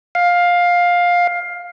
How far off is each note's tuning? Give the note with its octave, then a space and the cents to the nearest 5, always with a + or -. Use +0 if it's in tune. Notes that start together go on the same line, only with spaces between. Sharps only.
F5 +15